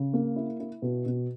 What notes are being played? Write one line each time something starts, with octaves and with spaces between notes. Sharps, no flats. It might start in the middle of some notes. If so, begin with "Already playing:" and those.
Already playing: C#3
A#3
E4
E4
B2
B2